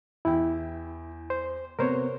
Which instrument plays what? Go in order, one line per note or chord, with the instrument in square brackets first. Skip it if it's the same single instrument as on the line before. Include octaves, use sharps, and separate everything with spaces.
[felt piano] E2 G5 [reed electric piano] E4
[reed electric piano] C5
[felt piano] C3 B3 [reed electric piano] A#4 C5 C#5